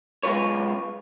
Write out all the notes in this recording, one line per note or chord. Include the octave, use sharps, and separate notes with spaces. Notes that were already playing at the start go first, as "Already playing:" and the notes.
B1 G#3 F4 B4 C#5